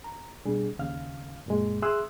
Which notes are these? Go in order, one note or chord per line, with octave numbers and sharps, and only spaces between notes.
A#5
B2 G3 D4 G#4
D#2 C#3 F5 F6
F#2 A#2 G#3
G#4 E5 C6 D#6 E6 F#6